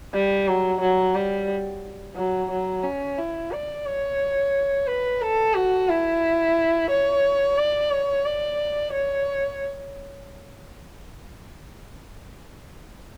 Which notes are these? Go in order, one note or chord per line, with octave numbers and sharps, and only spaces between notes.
G3
F#3
F#3
G3
F#3
F#3
C#4
E4
D5
C#5
B4
A4
F#4
E4
C#5
D5
C#5
D5
C#5